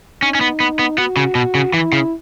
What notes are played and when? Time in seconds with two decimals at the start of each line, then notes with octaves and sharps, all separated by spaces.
0.22 C#4 D#4
0.35 C#4
0.41 B3
0.60 B3
0.79 B3
0.98 B3 F#4
1.17 C#3
1.35 B2
1.55 C#3
1.74 E3 E4
1.93 C#3